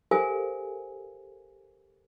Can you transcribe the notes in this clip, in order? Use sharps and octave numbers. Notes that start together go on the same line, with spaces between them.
G4 A4 A#4 C5 F5 G#5